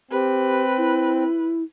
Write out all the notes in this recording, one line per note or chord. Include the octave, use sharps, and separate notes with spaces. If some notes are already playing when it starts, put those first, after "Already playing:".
C4 G4 B4
E4